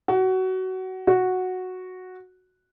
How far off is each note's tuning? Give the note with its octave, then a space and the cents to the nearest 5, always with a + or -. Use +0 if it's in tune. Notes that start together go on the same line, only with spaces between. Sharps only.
F#4 +20
F#4 -5